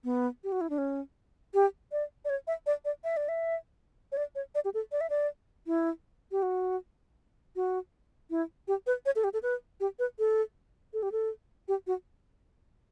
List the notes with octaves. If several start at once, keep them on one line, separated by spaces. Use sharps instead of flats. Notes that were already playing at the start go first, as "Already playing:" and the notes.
B3
G4
F#4
E4
D4
C#4
G4
D5
D5
C#5
E5
D5
D5
E5
D5
E5
C#5
D5
C#5
D5
G4
A4
D5
E5
D5
E4
G4
F#4
F#4
E4
G4
B4
C#5
A4
G4
A4
B4
G4
B4
A4
A4
G4
A4
G4
F#4